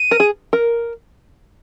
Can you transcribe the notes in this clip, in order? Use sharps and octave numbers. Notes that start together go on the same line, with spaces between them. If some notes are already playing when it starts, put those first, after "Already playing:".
Already playing: D#7
A#4
G#4
A#4